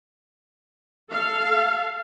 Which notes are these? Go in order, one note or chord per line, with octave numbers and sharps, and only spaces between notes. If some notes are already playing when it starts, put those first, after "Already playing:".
A4 F5